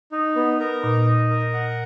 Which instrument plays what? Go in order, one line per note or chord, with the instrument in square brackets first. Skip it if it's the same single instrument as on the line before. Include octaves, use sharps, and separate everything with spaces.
[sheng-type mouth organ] D#4
B3
A#4
[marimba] A#2 [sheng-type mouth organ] D#4
[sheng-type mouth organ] D#5
A#4
F#5